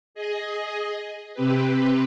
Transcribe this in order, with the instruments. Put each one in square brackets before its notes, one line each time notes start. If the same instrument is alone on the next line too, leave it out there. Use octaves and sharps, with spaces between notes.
[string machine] G#4 D#5
C3 C4 G4 B4